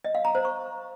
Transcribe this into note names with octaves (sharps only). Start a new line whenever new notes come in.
D#5
F5
A#5
C5
C#6